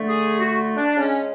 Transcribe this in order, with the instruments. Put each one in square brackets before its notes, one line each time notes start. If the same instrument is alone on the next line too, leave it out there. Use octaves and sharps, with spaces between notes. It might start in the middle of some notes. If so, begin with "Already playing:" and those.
Already playing: [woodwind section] D3 A3
G#4
F#4
D4
C#3 G#3 C#4